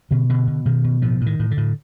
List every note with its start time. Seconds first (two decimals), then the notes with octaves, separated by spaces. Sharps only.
0.11 B2 D3
0.29 B2 D3
0.47 B2
0.65 B2 D#3
0.84 B2
1.02 A2 F3
1.21 A2
1.26 D#3
1.39 A2
1.51 D3
1.57 A2